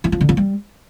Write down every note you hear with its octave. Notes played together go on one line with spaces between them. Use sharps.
E3
F3
D3
F3
G3